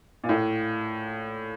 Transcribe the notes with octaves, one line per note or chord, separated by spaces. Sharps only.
A#2
A2